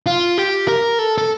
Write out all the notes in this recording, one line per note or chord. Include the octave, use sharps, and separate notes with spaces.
F4
G4
A#4
A4
A4